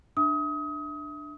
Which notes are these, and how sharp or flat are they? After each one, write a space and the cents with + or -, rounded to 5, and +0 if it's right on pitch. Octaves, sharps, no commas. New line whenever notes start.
D4 +15 E5 +0 D#6 +30